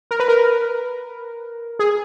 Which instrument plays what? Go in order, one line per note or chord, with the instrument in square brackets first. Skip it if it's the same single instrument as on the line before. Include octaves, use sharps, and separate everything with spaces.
[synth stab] A#4
B4
A#4
G#4